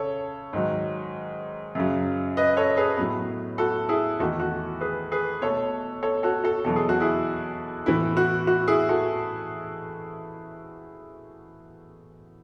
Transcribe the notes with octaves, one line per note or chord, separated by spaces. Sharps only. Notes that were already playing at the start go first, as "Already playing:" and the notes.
Already playing: C#3 A4 C#5
G#2 D#3 F#3
F#2 C#3 F#3
B4 D#5
A4 C#5
G#4 B4
A2 F#3 B3
F#4 A4
E4 G#4
E2 D#3 A3 F#4 A4
F#4
G#4 B4
G#4 B4
B2 A3 A4 C#5
A4 C#5
F#4 A4
F#4 A4
E2 B2 F#3 A4
G#4
F#4
E4 G#4
A2 E3 B3 E4
F#4
F#4
E4 G#4
F#4 A4